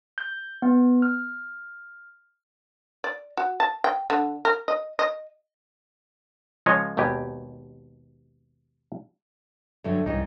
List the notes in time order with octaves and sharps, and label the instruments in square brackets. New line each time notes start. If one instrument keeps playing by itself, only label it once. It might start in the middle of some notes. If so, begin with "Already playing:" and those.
[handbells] G6
B3
F6
[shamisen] D5
F#4
A5
G5
D3
A#4
D#5
D#5
[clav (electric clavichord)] C#2 F3 G#3 C#5 D#5
G#1 D#2 B2 G4 G#5
[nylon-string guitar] G2 D3 F#3 [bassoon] A3
[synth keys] C2 G#2 G3 [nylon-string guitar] C#3 E3 [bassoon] D#4